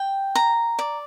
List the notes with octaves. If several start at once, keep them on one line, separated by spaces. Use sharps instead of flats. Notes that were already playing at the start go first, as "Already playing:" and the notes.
Already playing: G5
A#5
D5